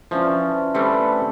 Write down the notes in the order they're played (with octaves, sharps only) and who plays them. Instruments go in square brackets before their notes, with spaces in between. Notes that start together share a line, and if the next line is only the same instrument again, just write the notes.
[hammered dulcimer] E3 C#4 D4 [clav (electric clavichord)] F3
[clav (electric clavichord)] G3 A3 C4 [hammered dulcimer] A4 D5 [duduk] B4